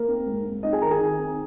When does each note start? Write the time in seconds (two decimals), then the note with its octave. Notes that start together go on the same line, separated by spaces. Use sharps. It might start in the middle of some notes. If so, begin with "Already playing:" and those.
Already playing: A#3 A#4
0.08 C4
0.27 G#2
0.44 G#2
0.63 C4 D#4 D#5
0.72 G#4 G#5
0.81 D#3 A#4 A#5
0.91 G#4 G#5
1.00 D#3
1.19 C4